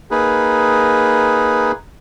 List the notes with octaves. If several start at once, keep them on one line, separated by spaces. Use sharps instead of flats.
A#3 D#4 G#4 B4